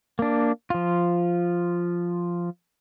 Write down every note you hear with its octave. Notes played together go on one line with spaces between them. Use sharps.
A#3 D4
F3 F4